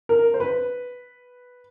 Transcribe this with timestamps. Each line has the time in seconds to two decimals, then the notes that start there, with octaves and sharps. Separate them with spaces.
0.09 A#4
0.34 C5
0.40 B4